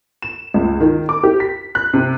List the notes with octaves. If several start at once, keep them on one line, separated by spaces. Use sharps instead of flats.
E7
C#2
D#3
D6
G4
B6
F#6
C3